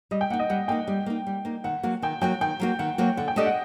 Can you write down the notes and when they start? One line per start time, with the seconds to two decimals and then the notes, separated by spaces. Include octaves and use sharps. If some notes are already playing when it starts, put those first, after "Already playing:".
0.11 G3 D#5
0.21 G5
0.30 A#3 F#5
0.33 D#4
0.39 D#5
0.50 G3 F#5
0.68 A#3 D#4 G5
0.88 G3
1.06 A#3 D#4
1.27 G3
1.45 A#3 D#4
1.64 D#3 F#5
1.83 F#3 A#3 F#4
2.02 D#3 G5
2.21 F#3 A#3 F#4 G5
2.41 D#3 G5
2.60 F#3 A#3 F#4
2.79 D#3 F#5
2.98 F#3 A#3 F#4
3.17 D3 F#5
3.28 G5
3.36 A3 D4 G4 D5 D#5
3.46 F#5